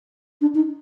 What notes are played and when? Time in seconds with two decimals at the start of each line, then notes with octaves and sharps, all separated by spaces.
0.41 D4
0.55 D#4